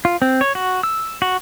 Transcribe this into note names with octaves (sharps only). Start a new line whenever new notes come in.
F4
C4
C#5
F#4
E6
F#4